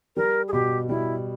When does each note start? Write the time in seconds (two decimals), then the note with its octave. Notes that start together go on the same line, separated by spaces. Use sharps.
0.16 G3 A#4
0.48 G#4
0.53 B2 G4
0.89 G3 E4